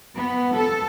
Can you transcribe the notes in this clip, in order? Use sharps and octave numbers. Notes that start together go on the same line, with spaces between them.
B3
A4